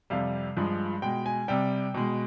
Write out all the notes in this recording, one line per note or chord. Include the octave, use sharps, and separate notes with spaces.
F2 C3 G3 F5
G2 F3 G#3
B2 G#3 G5
G#5
C3 G3 G5
B2 G#3